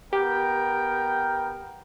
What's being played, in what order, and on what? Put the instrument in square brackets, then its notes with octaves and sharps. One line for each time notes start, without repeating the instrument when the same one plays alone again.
[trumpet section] B3 A#4 G5 [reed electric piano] G4